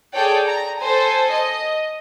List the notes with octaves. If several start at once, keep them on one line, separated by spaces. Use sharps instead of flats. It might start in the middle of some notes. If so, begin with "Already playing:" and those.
G#4 A4 C#5 D5 G5
A#5
A4 C5 G#5
D#5